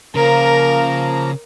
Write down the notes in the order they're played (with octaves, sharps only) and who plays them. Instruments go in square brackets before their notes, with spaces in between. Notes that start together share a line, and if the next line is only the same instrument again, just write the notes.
[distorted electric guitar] C#3 [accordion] F3 A#3 A#5 [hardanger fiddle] A#4